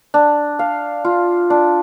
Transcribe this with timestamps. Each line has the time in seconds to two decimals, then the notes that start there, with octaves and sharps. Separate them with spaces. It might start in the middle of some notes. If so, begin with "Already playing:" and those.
0.14 D4
0.59 F5
1.05 F4
1.50 D4